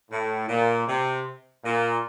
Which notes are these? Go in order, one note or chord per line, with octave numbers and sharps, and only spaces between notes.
A2
A#2
C3
A#2